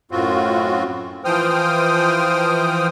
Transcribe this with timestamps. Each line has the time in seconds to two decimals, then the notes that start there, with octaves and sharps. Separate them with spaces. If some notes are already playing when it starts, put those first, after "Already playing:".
0.11 F#2 A2 C4 F4 F#4
1.25 E3 F3 C5 G5 D#6 F6